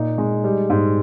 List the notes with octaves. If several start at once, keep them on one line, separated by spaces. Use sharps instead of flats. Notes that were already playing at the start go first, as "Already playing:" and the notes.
Already playing: A#2 D#4
G#3
G3
G#2